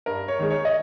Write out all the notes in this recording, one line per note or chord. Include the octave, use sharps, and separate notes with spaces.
G2 A#4
C#5
D#3 G#3
C#5
D#5